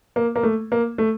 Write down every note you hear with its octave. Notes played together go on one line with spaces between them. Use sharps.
A#3
A#3
A3
A#3
A3